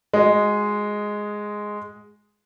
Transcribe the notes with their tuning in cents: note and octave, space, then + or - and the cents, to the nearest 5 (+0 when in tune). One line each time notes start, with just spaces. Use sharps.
G#3 +0 F#4 -20 D#5 +0